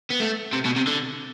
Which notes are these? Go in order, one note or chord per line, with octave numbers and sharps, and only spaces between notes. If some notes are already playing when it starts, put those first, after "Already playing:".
B3
A3
C3
B2
C3
D3